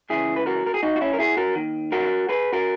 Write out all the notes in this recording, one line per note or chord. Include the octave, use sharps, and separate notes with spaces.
C#2 C#3 E3 E4 G#4
B4
F#4 A#4
A#4
G#4
D#4 F#4
F#4
C#4 E4
A#4
E4 G#4
F#4 A#4
D#2 D#3
F#4 A#4
G#4 B4
F#4 A#4